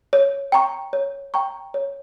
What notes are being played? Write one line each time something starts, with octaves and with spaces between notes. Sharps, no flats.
C#5
G5 A#5 C#6
C#5
G5 A#5 C#6
C#5